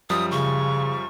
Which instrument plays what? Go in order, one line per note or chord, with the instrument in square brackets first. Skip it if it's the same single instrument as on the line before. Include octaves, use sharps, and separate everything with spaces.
[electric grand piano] F#2 F3 G3 [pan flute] D#6
[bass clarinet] C#3 [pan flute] C#6